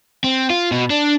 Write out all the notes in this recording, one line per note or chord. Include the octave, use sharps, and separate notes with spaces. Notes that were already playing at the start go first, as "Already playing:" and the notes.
C4
F4
B2
D4